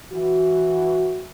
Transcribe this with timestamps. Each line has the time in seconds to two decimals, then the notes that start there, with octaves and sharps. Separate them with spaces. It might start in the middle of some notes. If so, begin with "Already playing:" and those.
0.13 E3 F#4